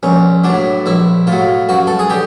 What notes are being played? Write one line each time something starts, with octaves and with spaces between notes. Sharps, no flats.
A#1 C#4
F#3 D4
A2
A#1 E4
A2 F#3 F4
F#2 F#4
A4
G#4
D3 G4